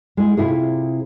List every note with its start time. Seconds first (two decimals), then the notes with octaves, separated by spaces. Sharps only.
0.17 G#3 E4
0.37 C3 E4 F4 G#4